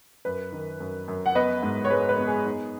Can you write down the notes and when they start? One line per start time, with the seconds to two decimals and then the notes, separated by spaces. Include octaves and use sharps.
0.25 F#2 B4
0.52 D#3
0.80 F#2
1.08 F#2
1.26 F#5
1.35 B3 B4 D#5
1.63 G#2
1.85 C#5
1.90 G#3 B4
2.09 B4
2.18 B3
2.27 G#4
2.46 D#4